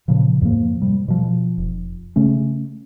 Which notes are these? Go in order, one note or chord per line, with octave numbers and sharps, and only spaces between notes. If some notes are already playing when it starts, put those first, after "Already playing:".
A#2 C#3 F3
F2 G#2 F3 A#3
C3 G3
B2 F3
F1
C#3 A3 C#4